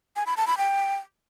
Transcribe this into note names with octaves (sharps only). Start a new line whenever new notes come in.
G#5
B5
A5
B5
G5